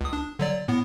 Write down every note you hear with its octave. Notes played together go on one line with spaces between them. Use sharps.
C#2 D#6
D4
D3 F#3 D5
A2 B3